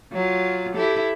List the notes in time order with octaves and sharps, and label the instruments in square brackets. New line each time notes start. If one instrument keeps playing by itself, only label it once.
[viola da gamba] F#3 F4
E4 G4 A4